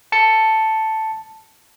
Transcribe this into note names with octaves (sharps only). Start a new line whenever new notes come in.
A5 C#7